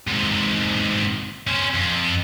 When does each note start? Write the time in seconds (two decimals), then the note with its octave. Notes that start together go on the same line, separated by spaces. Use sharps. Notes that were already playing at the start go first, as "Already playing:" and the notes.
0.07 G#2 C3
1.47 C#4 C5
1.74 F2